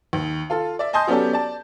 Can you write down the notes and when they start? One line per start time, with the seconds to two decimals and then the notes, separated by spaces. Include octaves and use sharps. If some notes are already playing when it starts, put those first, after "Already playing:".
0.13 D#2
0.50 F4 A4
0.79 D5 E5
0.93 D#5 G#5 A5 C6 D#6 G6
1.07 F#3 B3 C#4 G4 A4 D5
1.33 D5 A5